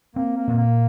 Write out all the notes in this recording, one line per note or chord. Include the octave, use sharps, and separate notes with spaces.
A#3 C4
A#3
A#2
A#3